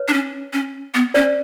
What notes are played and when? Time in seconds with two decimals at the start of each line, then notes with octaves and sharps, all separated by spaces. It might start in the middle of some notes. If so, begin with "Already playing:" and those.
Already playing: B4 C#5
0.08 D4
0.13 C#4
0.53 C#4
0.94 B3
1.14 C#4 C5 D5